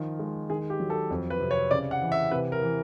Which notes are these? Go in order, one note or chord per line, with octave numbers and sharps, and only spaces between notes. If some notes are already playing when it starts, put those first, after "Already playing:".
Already playing: D#3 F3
G#3
D#3 G#4
G4
F#3
A4
F2
B4
C3
C#5
C#3 D5
F#5
E3
E5
C3 B4
A#4
E3